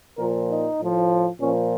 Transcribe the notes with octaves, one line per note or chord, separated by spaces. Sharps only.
A#2 F3 A#4
D#4
A2 F3
A#2 F3 C#4